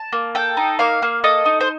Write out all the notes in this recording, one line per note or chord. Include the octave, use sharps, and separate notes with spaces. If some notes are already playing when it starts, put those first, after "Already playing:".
Already playing: A5
A#3
A4 G5
D#4
A#3 F5
A#3
A4 D#5
D#4
C5